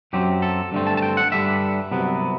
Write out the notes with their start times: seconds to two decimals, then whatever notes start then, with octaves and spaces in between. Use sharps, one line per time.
0.13 F#2 F#3 C4 G4
0.42 A4
0.72 G2 D3 A3 C4
0.87 A5
0.97 A5
1.02 G5
1.17 F#5
1.32 G2 D3 G3 E5
1.92 C2 C3 F#3 B3